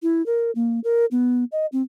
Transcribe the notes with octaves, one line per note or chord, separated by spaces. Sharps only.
E4
A#4
A#3
A#4
B3
D#5
C4